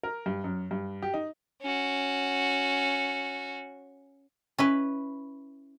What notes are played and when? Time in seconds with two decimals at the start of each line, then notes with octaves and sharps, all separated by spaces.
0.03 A#4
0.26 G2
0.44 F#2
0.71 G2
1.02 G4
1.14 D#4
1.62 C#4 F#4
4.58 C#4 E4 B4